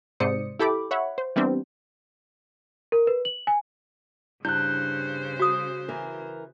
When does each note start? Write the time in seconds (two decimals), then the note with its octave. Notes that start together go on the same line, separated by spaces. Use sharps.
0.20 G#2 C3 C5 D5 D#6 C#7
0.59 E4 G4 A4 B5 D6
0.91 C#5 E5 F#5 B5
1.18 C5
1.36 E3 G3 B3 C4 D4
2.92 A#4
3.07 B4
3.25 F#7
3.47 G#5
4.45 G2 C#3 E4 C5 F#6 G6
5.40 F#4 D#6
5.89 E3 A#4